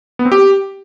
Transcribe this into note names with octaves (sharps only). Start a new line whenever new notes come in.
B3
C4
G4